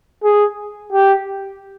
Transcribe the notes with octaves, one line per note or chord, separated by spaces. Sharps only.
G#4
G4